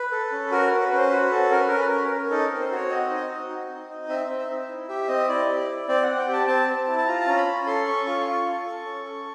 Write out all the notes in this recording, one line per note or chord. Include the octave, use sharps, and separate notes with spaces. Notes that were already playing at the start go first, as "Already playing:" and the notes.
Already playing: B4
A4
C#4
F#4 A#4
C#4 B4
B4
C#4
C5
F#4 B4
C#4 A4
C#4 A#4
B4
C#4 A#4
B4
C#4 A#4
B4
C#4 A#4
D#4 A4
C4 A#4
C5
F#4 C#5
C4 D#5
D#4
F#4
D#4
C4
D#4
C4 E5
C4
E5
D#4
E4
G4 E5
C4 D#5
E4 D5
G4
E4
C4 D5
C4 F#5
G5
G4
A5
C4 A5
C4
E4
A5
F4 A#5
A5
C#4 A#5
B5
C#4
A4 C6
C#4 C#6
F4 C#6
C6
F4 C#6
A4
A4
C#4
A4